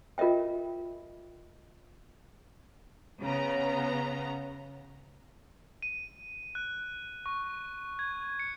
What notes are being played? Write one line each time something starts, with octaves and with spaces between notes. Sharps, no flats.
F4 A#4 D#5 E5 G5
C#3 B3 A#5
D#7
F#6
C#6
G#6
C#7